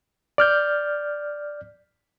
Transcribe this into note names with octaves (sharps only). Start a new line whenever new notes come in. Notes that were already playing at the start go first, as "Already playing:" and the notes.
D5 F6 G6